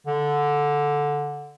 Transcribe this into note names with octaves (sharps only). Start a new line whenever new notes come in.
D3